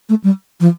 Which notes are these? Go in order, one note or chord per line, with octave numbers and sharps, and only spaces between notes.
A3
G3
F3